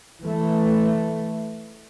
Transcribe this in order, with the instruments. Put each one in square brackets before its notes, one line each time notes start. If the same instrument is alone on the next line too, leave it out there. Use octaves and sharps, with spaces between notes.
[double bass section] E3 A3